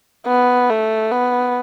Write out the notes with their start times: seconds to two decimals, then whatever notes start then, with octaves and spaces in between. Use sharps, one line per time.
0.27 B3
0.69 A3
1.11 B3